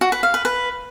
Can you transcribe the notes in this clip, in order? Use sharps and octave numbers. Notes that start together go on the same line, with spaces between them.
F#4
B4
F5
B4
B4